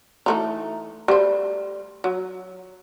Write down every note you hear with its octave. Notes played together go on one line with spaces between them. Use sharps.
E3 A3 D#4
G3 A3 C5
F#3